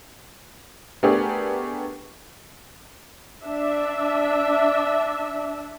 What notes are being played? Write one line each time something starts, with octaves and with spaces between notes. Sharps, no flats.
A3 B3 D4 G4 G#4 A#4
D4 E5